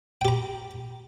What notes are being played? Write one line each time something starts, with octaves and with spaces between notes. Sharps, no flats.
G4 G5 A#5